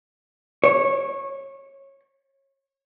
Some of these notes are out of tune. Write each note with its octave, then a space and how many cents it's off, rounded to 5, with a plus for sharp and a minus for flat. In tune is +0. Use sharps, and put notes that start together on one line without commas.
C#5 -20